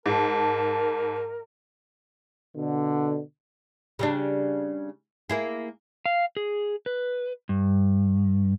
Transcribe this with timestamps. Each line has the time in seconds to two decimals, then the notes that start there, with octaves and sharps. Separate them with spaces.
0.06 G#2 A#4 A5
2.55 B2 D3
3.99 C#3 G3 D4
5.30 A#3 E4 G#4
6.06 F5
6.37 G#4
6.86 B4
7.49 G2